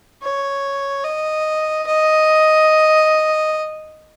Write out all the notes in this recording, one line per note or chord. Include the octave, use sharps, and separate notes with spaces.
C#5
D#5
D#5